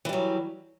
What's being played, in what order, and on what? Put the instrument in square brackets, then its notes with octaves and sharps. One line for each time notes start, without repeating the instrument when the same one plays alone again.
[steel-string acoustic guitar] E3
G3
F#3